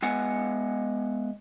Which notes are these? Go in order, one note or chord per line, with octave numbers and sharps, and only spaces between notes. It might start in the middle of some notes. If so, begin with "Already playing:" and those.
G#3 B3 D#5 F#5 G#5